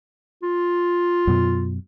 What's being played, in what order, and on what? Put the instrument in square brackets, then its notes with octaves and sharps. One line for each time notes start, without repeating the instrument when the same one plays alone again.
[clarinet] F4
[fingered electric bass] F#2 B2